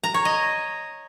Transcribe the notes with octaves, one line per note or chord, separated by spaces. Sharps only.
A#5
C#5
D#5